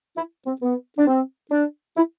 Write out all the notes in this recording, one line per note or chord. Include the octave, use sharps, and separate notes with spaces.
E4
C4
B3
D4
C4
D4
E4